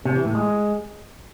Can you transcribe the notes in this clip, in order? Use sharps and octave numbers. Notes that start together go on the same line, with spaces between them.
C3
E3
A2
G#3